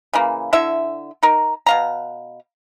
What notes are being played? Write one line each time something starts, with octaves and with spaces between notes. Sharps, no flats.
C#3 E3 A#3
D3 E4 E5
D#4 A#4
B2 F5 A#5